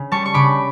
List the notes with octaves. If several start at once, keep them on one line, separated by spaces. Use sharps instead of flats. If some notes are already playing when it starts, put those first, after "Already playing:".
Already playing: C#3
G3 A5 C#6
C#6
C#3 B5 D6